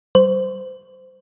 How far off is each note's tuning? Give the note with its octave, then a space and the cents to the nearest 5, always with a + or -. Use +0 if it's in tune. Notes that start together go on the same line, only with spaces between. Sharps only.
G3 -35 C5 -20